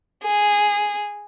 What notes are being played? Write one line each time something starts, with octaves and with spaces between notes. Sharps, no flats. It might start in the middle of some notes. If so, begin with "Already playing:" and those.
G#4